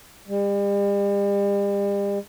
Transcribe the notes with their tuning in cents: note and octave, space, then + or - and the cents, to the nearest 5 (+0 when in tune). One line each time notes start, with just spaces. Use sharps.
G3 +40